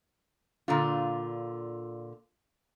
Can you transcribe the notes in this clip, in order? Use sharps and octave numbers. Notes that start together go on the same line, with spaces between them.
A#2 D3 F4